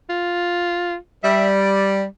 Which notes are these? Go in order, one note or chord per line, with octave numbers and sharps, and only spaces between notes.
F4
G3 E5
D5